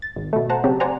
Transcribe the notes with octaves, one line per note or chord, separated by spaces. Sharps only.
A6
G#1
B2 A3
C5 F#5 A5 A#5
C#3 F#3 C4 G4
C5 D5 F#5 G#5 A#5